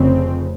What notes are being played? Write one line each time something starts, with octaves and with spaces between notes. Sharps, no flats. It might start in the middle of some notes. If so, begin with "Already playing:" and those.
Already playing: F1 F2 C#3 C4